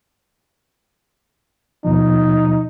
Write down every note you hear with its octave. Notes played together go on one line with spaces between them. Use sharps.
D#2 B2 F3 D#4